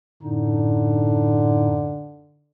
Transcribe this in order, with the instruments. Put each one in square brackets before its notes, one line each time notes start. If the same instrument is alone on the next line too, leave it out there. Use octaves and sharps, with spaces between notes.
[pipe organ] F#2 A2 D#4 [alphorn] D3